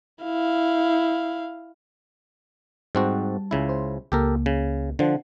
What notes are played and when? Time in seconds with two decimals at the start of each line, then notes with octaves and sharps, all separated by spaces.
0.23 E4 F5
2.95 G#2 G3 C4 F#4 A5
3.51 C#2 C#3 E4
3.69 C5
4.12 C#2 A#3 G4 A4 A#4
4.46 C#3
4.99 D3 F3 D4 C5 F#5